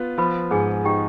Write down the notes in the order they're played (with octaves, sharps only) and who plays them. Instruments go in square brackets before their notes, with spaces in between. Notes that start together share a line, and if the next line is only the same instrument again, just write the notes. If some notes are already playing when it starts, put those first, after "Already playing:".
Already playing: [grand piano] B3 F4
[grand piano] F3 [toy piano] B4 B5
[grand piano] G#2 [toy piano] G#4 G#5
[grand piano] D#4 [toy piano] G4 G5